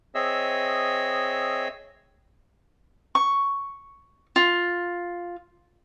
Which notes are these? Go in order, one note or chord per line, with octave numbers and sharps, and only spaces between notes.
C4 G#4 C#5 D#5 E5 E6
C#6
F4